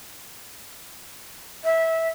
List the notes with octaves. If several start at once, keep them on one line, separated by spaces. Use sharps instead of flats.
E5